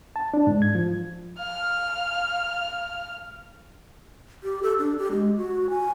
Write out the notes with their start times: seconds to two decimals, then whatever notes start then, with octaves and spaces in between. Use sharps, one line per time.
0.16 A5
0.34 D4
0.47 G#2
0.62 G#6
0.75 F3
1.39 F5 F6
4.44 G4
4.63 A4
4.79 D4
4.98 G4
5.12 G#3
5.37 F#4
5.70 G#5